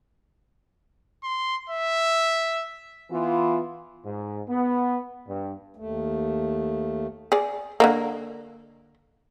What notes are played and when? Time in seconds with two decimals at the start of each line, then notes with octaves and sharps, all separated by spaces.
1.23 C6
1.70 E5
3.11 E3 B3 F4
4.05 G#2
4.48 B3
5.28 G2
5.76 D#2 A3
7.32 G#4 D5
7.80 D3 F#3 A#3